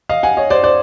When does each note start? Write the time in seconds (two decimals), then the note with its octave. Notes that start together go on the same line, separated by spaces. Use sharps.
0.09 D#5 F5
0.23 F#5 G#5
0.37 C#5 D#5
0.50 C5 D5
0.63 C5 D5